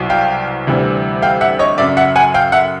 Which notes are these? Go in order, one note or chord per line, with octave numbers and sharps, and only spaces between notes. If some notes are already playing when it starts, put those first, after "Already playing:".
Already playing: C2 B2 F#3
F5 G5
D2 C3 E3 G3
F5 G5
E5 F#5
C#5 D#5
F#2 C#3 F#3 D5 E5
E5 F#5
F#5 G#5
F5 G5
E5 F#5